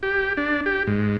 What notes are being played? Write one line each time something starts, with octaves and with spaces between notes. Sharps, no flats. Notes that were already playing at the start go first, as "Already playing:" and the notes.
G4
D4
G4
G#2